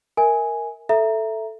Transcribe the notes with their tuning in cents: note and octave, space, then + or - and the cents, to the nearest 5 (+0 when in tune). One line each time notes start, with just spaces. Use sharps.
A#4 +0 E5 -30 G#5 +0
A4 +0 E5 +10 A#5 +0